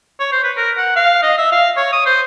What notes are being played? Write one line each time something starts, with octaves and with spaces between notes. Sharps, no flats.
C#5
C5
B4
A#4
F#5
F5
D#5
E5
F5
C#5
D#6
C5